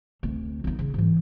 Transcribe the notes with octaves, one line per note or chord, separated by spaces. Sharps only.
D2 C3
B1 D#4
C#3
G#2 E3